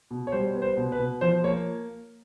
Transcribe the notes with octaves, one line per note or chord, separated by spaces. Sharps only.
B2
C#5
G3 C5
B3
C5
B2
B4
B2
F3 C5
A#3 C#5